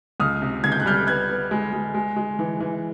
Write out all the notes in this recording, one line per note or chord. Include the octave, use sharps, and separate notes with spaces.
C#2 D#6 F6
C3
C#2 G#6
G6
F#6
G3 F6 G6
B3 F#6 G#6
B3
G#3
G#3
G#3
G#3
E3
E3